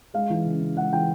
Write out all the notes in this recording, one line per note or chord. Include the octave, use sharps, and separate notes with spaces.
G#3 F5
E3
C#3
C#3
G#3 F#5
E3 G5